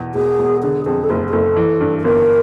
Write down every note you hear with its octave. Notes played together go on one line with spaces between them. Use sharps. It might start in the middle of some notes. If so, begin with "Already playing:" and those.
Already playing: E2 B2
E1 G#4
E1
D3 G#4
F2 G#4
A4
F#1 G#4
G#4
F#1 A4
E3
G2
A4
G1 A#4